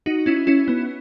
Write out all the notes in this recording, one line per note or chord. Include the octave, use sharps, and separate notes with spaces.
D#4 F#4
C#4 E4
C#4 E4
B3